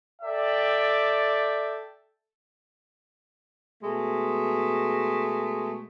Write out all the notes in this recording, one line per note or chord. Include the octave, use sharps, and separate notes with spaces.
A4 D5 E5 G5
B2 G#3 A3